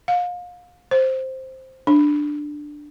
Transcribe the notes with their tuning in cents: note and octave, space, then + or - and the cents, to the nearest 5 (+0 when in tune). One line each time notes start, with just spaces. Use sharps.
F5 +30
C5 +5
D4 +5